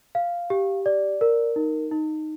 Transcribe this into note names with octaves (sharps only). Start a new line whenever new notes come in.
F5
G4
D5
A#4
D#4
D#4